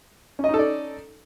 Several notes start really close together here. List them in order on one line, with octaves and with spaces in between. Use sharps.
C#4 D#5 D#4 A4 D5